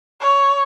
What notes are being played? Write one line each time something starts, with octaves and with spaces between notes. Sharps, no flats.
C#5